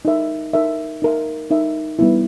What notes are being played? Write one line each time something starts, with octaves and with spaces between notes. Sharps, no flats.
D#4 A#4 E5
D#4 A#4 E5
D#4 A#4 E5
D#4 A#4 E5
G3 B3 E4